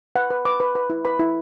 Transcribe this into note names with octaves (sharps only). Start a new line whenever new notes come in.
B4 F#5
B4
B4 D6
B4
B4
E4
B4 B5
E4